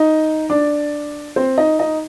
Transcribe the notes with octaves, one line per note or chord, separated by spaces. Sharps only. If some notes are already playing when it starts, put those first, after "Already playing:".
Already playing: D#4 D#5
D4 D5
C4 C5
D#4 D#5
D#4 D#5